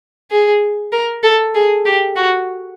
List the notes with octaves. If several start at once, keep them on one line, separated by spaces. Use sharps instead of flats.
G#4
A#4
A4
G#4
G4
F#4